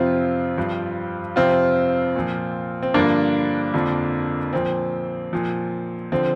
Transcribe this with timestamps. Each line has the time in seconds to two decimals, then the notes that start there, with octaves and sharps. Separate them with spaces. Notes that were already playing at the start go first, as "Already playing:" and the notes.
Already playing: F2 C3 F3 C4 F4
0.57 G2 F3
1.36 F2 C3 F3 C4 F4
2.16 A#2 F3
2.83 C4
2.94 G2 D3 F3 A#3 D4
3.74 F2 D3 F3
4.53 A#2 F3 C4
5.33 A#2 F3
6.12 D3 F3 C4